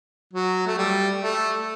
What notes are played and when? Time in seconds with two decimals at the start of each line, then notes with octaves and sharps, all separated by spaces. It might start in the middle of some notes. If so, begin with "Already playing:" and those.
0.33 F#3
0.67 A3
0.78 G3
1.22 A3